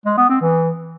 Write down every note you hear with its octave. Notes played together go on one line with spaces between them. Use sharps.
G#3
B3
C4
E3